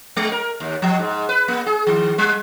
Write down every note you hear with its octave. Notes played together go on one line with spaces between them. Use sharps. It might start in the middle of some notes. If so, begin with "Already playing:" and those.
G#3
A#4
D#2
F3
G#2
B4
A#3
G#4
D#3
G3